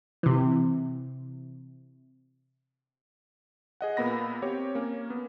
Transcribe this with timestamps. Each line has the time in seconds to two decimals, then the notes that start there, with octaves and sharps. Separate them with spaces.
0.23 C3 E3
3.81 G#4 D#5 F#5
3.97 A#2 A#3 B3 B5 A#6
4.42 C4 G4 C#5
4.75 A#3 C#4
5.10 B3